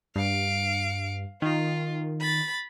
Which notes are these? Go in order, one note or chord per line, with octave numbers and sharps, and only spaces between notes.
G2 F5 D7
D#3 F4
B5 A6